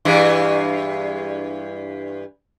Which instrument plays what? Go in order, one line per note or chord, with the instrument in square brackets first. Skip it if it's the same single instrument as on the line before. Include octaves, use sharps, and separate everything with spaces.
[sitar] G2 E3 G#3